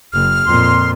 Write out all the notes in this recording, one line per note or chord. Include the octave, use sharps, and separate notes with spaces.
F#1 F6
F2 A#2 C6